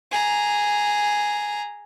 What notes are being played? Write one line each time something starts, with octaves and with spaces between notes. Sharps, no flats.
G#4 A#5